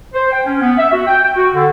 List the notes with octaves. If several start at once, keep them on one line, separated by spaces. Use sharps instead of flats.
C5
G5
C#4
B3
E5
F#4
G5
G5
F#4
D3